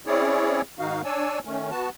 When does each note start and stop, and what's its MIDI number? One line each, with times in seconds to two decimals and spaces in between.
0.07 0.62 60
0.07 0.62 61
0.07 0.62 64
0.07 0.62 68
0.07 0.62 73
0.07 0.62 74
0.79 1.02 44
0.79 1.02 51
0.79 1.02 63
0.79 1.02 66
0.79 1.02 77
1.04 1.39 62
1.04 1.39 73
1.04 1.39 74
1.04 1.39 80
1.04 1.39 88
1.45 1.71 51
1.45 1.71 57
1.45 1.71 61
1.71 1.90 59
1.71 1.90 66
1.71 1.90 81